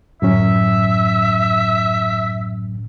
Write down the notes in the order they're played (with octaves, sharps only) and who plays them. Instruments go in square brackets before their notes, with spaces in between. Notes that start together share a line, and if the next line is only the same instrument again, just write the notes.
[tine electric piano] G1 A2 [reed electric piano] F#2 F#3 C#4 [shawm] E5